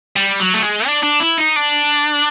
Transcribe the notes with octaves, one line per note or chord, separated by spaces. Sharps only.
G3
F#3
A3
G#3
D4
D4
E4
D#4
D4